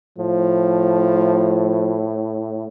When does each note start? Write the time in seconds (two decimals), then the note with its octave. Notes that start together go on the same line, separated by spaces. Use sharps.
0.19 A2 F3